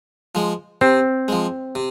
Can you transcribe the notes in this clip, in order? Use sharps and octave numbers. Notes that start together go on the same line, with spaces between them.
F3 G#3
C3 C4
F3 G#3
C3